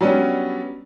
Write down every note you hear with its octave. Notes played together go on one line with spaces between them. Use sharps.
F#3 G3 B3 C#4 D4